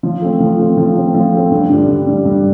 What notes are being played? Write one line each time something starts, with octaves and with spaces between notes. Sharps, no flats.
F3
A3 C4
F3
A3 C4
F3
A3 C4
F3
A3 C4
G2
D3 G3
G2
D3 G3
G2